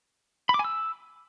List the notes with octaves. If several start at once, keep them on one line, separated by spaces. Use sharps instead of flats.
B5
D6
G#5
E6